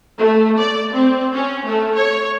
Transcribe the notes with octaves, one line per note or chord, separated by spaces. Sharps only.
A3
D5
C4
C#4
A3
C#5